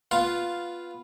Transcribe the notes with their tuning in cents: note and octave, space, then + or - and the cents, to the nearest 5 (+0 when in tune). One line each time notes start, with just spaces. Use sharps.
B3 +0 F4 +0 F5 -5